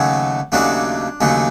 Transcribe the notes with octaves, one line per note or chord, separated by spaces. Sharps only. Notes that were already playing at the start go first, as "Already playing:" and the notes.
Already playing: D#2 C#3 F#3 A3
D#2 C#3 F#3 A3 D4
D#2 C#3 F#3 A3